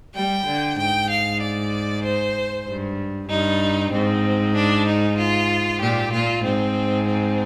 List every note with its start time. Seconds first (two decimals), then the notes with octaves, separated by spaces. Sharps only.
0.15 G3 G5
0.46 D3
0.78 G#2 G5
1.10 F5
1.41 D5
2.03 C5
2.67 G2
3.30 G2 D#4
3.92 G#2 C4
4.55 D4
4.87 D#4
5.18 F4
5.81 A#2 G4
6.12 A#2 F4
6.44 G#2 C4
7.07 C4